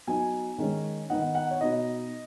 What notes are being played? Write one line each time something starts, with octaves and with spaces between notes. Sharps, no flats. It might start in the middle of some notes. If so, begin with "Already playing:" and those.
F#3 B3 D#4 G#5
D#3 G#3 C#4
D#3 B3 D#4 F#5
F#5
C#5
B2 B3 D#4 D#5